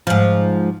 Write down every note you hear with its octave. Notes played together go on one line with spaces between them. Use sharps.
G#2 F3